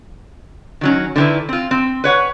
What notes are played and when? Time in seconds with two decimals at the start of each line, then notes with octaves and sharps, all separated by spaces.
0.81 D#3 F#3 C#4
1.16 D3 D#3 C4 E4 B4
1.49 C4 F4
1.71 C4
2.04 B4 C#5 F#5